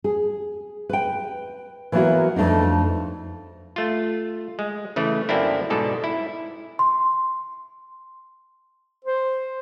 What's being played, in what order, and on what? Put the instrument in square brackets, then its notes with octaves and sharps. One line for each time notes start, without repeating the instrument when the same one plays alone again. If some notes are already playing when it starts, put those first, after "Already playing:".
[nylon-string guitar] G#4
B4 G5
E3 F#3 A#3 B3 E4 F#4
F2 A3 D4 D#4
[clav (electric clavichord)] A3 F4
G#3
C#3 E3 A3
F#2 D3 A#3 C4 D4 E4
G#2 B2 A4 D5
E4
[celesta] C6
[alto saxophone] C5